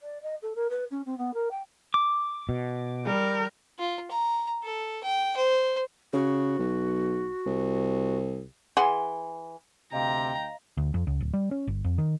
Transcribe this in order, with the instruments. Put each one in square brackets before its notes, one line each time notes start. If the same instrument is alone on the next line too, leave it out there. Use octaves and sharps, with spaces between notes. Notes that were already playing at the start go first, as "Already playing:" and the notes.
[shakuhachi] D5
D#5
A4
A#4
B4
C#4
C4
B3
A#4
G5
[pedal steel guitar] D6
[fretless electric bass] B2
[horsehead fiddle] G3 A#4
[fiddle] F4
A#5
A4
G5
C5
[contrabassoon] C#3 [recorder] F#4
[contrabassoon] B1
C2
[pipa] E3 G#4 F#5 C6
[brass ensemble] D2 G5 [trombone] C3 [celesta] D#5 F5 [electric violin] A#5
[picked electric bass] D2
F2
C#2
D1
G3
C#4
G1
F2
D#3